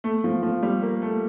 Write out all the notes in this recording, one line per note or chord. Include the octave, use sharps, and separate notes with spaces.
A3
F3
F3
G3
A#3
A3